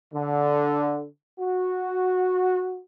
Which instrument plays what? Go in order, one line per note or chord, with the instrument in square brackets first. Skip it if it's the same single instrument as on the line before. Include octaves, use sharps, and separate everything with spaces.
[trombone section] D3
F#4